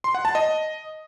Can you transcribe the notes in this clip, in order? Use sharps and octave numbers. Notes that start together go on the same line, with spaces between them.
C6
F#5
A5
D#5